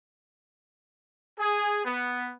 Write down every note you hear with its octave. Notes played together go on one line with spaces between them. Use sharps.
G#4
B3